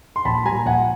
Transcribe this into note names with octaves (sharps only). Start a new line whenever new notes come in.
C6
A#1 A5 B5
A#2 G3 G#5 A#5
A#1 F#5 G#5